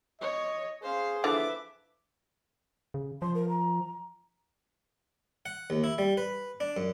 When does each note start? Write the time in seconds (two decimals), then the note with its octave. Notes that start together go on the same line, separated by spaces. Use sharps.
0.21 C#5 D#5
0.83 C#4 G#4 C5 F5
1.24 D3 E3 F3 B4 E5 D6
2.94 C#3
3.22 F3 C6
3.35 A#4
3.49 A#5
5.46 F#5
5.70 D#2
5.84 E4
5.98 G3
6.17 B4
6.60 D4
6.77 F#2